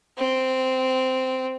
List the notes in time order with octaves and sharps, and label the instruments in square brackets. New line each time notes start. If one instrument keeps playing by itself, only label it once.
[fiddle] C4